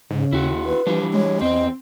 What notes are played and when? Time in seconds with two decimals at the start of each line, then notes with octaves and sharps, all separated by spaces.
0.10 G#2 C#3
0.32 D#2 E4 F#4
0.66 B4
0.87 E3 F3 G3 D4
1.14 G#3 C#5
1.41 E2 C4 C5 D#5